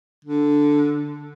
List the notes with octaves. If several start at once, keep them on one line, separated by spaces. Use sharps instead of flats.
D3